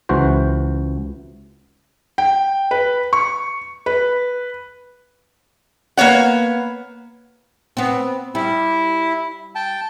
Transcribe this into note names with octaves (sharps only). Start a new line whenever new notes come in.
C#2 E3 F#4 C5
G5
B4
C#6
B4
A#3 B3 C#5 F#5
B3 C4
G3 E4
G5 A5